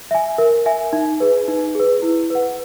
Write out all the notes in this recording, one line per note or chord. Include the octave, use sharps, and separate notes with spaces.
E5 G#5
A#4
E5 G#5
D#4
G#4 B4
D#4
G#4 B4
E4
B4 F#5